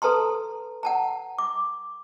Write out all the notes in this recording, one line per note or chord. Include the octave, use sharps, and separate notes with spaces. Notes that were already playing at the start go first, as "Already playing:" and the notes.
A4 B4 A5 A#5 C6
F#5 A5 A#5
D6